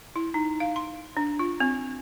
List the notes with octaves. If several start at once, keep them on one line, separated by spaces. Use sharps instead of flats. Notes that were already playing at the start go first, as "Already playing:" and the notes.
E4
D#4
F5
C6
D4
F4
C4